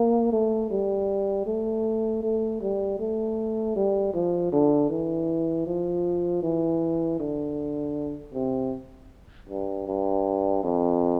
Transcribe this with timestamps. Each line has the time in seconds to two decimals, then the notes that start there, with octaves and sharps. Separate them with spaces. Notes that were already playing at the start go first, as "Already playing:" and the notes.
Already playing: A#3
0.32 A3
0.70 G3
1.46 A3
2.23 A3
2.61 G3
2.99 A3
3.76 G3
4.14 F3
4.52 D3
4.90 E3
5.67 F3
6.42 E3
7.20 D3
8.34 C3
9.49 G2
9.87 G2
10.63 F2